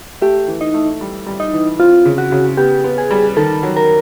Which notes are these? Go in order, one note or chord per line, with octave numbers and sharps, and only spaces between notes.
A3 G4
E3
D#4
A3
G3
G3
D#4
E3
C4 F4
C#3
F#4
C#3
B3 G4
B3
G#4
G3
D#3 A4
F#3
A#4